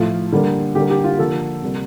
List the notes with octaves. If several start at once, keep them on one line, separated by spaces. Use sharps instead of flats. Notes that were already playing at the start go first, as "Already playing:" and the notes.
Already playing: A2 F3 A3 F4
D3 G3 A#3
D3 G3 A#3 G4
G4
F4
D3 F3 A#3 A4
C3 G3 A#3